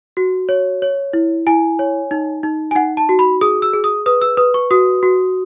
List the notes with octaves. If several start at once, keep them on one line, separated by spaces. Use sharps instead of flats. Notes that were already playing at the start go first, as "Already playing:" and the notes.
F#4
C#5
C#5
E4
E4 G#5
C#5
D#4
D#4
G#5
D#4 F#5
A5
F#4
B5
G#4 D#6
E6
G#4
D#6
B4 D#6
E6
B4 D#6
C#6
F#4 D#6
F#4